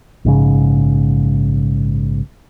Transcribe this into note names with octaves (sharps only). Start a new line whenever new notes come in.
A#1 G#2 C#3